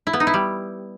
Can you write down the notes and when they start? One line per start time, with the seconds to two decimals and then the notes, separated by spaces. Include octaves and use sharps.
0.07 E4
0.13 B3
0.20 D#4
0.27 E4
0.34 G3